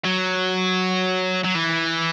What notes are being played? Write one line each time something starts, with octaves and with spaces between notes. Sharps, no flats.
F#3
F#3
E3